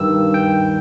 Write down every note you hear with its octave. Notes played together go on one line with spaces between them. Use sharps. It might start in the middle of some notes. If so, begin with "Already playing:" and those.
Already playing: G2 D#3 E6
G5